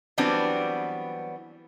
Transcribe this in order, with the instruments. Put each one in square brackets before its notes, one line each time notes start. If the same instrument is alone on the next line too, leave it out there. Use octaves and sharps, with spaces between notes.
[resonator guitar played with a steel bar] E3 F#3 G3 B3 C4 D4